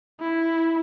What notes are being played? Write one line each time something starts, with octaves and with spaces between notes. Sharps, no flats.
E4